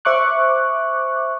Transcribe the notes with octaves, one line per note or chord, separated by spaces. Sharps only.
C5 E5 C#6 D6 F#6